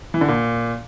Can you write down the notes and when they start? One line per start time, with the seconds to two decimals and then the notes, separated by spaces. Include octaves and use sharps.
0.14 E3
0.21 D3
0.28 A#2